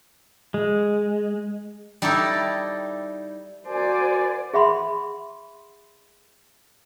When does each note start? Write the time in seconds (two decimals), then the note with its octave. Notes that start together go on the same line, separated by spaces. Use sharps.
0.54 G#3
2.02 G3 D#4 E4 G4 A4
3.68 F#4 A#4 C5 D5 G#5
4.54 G#4 E5 F#5 B5 C6